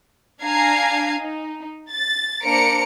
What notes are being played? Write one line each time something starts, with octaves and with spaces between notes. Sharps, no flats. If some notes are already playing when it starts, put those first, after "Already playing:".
D4 F5 G#5 A#5 G#6 C7
D#4
A6
A#3 D4 C5 A#5 C#7 D7